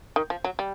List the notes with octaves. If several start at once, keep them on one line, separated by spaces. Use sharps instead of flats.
D#3
F3
F#3
G3